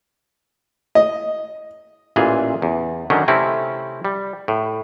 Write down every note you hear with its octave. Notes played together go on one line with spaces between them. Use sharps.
D#5
A1 A#2 E3 F4 G#4
E2
D3 D#3 F#3 C#4 D4
C3 A3 C4 C#4 E4
G3
A2